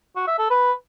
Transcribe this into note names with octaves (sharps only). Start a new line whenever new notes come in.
F#4
E5
A4
B4